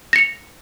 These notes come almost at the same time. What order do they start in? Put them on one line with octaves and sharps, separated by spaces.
A#6 C#7 F7